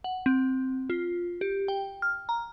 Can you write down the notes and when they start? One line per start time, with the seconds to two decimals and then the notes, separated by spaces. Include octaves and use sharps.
0.04 F#5
0.26 C4
0.90 F4
1.41 G4
1.68 G5
2.02 F6
2.29 A#5